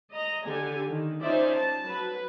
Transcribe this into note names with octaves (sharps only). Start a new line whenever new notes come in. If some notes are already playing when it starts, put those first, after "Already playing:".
D#5 A#5
D3 G4 A4 G#5
D#3
C#4 D#4 F4 C5 D5 E5
A5
F#3 B4